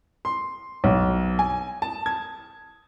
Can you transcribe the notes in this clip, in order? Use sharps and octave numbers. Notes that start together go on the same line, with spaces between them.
C6
B1
G#5
A5
G#6